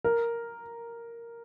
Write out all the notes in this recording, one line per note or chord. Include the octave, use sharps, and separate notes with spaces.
A#4